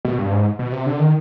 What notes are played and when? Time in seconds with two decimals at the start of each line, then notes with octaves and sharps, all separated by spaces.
0.05 B2
0.18 G2
0.32 G#2
0.59 B2
0.72 C3
0.86 D3
0.99 D#3